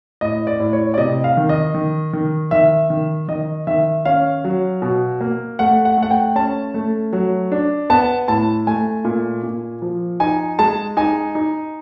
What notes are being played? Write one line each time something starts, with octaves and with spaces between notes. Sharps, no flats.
A2 D#5
D5
A2
C#5
D5
C3 D#5
F5
D#3
D#5
D#3
D#3
D#3 E5
D#3
D#3 D#5
D#3 E5
C#4 F5
F#3
B2
A#3
A3 F#5
F#5
A3 F#5
G5
C#4 A5
A3
F#3
D4
B3 A5
A2 A5
A3 G#5
A#2
A#2
F3
D#4 G#5
G#3 A5
D#4 G#5
D#4